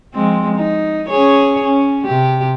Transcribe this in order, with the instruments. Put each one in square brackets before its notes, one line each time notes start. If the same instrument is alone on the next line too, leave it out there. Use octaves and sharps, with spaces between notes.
[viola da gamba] F3 G#3 C4
D#4
C#4 G#4 C#5
C#4
C3 G4